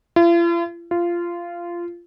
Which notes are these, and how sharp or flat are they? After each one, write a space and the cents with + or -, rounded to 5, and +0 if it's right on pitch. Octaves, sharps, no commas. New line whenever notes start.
F4 -45
F4 -15